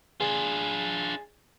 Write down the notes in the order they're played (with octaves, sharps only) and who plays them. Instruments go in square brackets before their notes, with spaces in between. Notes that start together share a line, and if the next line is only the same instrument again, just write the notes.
[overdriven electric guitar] D4 F4 [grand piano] G#4